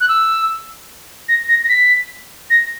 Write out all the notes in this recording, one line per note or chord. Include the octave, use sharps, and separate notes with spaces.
F#6
E6
A#6
A#6
A#6
B6
A#6